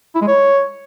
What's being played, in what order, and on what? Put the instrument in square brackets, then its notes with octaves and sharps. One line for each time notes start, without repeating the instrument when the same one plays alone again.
[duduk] E4
G#3
C#5